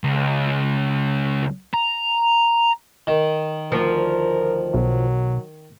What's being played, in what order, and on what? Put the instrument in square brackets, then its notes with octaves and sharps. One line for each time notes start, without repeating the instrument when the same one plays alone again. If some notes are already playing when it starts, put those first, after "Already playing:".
[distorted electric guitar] C#2
A#5
[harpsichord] D#3
[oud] D2 F3 [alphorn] A#4
[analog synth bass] B1 [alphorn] F#3